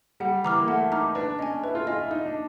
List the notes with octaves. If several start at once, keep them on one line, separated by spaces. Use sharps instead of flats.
G3 F#5
E3 A#5 D6 F6
A#3
A3 F#5
D#4 A#5 D6 F6
D4 B4
C#4 D#5 G#5
E4 B4
F4
F4 D#5 G#5
E4
D#4 D#5
D4